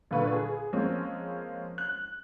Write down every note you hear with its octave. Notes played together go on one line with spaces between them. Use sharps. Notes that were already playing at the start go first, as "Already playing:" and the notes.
A#2 D3 F4 B4 C#6
G#4
F3 G#3 A#3 C4 C#4
F#6